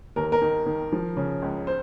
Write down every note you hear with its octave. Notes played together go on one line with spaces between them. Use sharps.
D#2 A#4
A#4
D#3
D#3
F3
C#3
C#2
C5